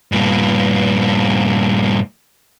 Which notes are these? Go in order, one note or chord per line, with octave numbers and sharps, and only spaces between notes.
G2 A#2